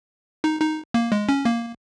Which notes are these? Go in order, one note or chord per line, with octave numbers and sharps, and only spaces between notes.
D#4
D#4
A#3
G#3
C#4
A#3